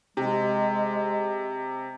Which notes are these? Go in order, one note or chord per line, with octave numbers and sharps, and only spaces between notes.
C3 G#3